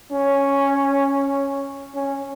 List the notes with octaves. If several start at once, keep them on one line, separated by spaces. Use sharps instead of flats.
C#4
C#4